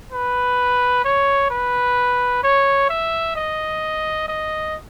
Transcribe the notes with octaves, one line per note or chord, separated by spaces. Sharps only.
B4
C#5
B4
C#5
E5
D#5
D#5